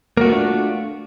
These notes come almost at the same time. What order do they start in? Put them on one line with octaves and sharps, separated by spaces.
A#3 F#4 A3 F4 D4